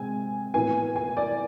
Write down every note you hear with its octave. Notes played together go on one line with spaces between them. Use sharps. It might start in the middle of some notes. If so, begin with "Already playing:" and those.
Already playing: C3 G#3 C4 G#5
A2 E3 B3 G#5
G#5
D5